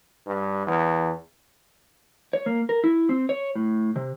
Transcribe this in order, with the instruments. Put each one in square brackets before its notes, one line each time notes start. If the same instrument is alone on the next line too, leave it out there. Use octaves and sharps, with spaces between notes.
[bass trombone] G2
E2
[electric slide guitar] C#5
A#3
A#4
E4
C4
C#5
A2
C3